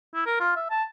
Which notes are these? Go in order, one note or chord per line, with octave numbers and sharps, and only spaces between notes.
E4
A#4
F4
E5
A5